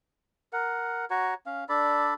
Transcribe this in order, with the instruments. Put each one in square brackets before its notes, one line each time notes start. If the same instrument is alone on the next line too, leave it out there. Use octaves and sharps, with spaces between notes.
[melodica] A#4 F#5
F#4 C#5 F#5 A#5
C#4 F5
D4 A4 D5 B5